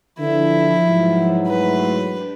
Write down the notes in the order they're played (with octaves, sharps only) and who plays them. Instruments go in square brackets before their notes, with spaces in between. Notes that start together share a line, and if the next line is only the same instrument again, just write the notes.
[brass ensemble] D3 E3 [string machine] F3 [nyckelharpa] E4
[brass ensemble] G#2 E3 F#3
[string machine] A3 C6 [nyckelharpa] B4
[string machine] D4 G4